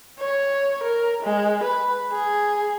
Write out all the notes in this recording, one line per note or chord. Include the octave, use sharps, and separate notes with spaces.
C#5
A#4
G#3
B4
G#4